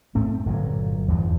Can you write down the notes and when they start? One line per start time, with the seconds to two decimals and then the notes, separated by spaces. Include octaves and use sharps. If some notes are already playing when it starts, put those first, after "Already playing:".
0.15 G#2 A3 C4
0.46 G1 A#2 C#3 F#3
1.08 E2 G2 F3